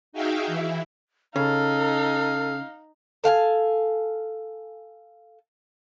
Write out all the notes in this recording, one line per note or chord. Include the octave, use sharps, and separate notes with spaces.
D#4 F#4 G#4 E5 F5 G5
E3 E4
C#3 D#4 A4 F5
A4 F5 G5 G#5